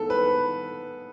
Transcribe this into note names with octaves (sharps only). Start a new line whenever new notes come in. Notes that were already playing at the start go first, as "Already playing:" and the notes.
Already playing: D#3 G#3 B3 A4
B4